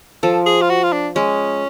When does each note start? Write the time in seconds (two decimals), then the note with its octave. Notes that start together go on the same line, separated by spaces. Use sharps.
0.23 F3 A4
0.46 G#4
0.62 F4
0.70 F#4
0.84 F4
0.93 D4
1.16 G#3 C#4